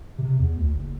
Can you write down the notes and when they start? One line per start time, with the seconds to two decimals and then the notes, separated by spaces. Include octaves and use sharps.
0.18 C3
0.39 E2
0.57 D2
0.75 F#1